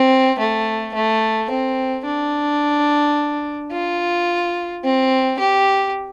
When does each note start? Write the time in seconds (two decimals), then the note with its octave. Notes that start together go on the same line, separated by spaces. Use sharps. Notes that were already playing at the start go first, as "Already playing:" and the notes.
Already playing: C4
0.39 A3
0.94 A3
1.50 C4
2.05 D4
3.72 F4
4.84 C4
5.39 G4